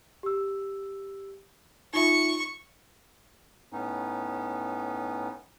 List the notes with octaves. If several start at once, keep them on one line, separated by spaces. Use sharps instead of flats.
G4 E6
D#4 F4 E5 C#6
A2 B3 C#4 D#4